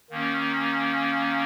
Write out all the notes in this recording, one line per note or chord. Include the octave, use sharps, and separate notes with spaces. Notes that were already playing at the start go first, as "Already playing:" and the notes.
D#3 A#3 C#4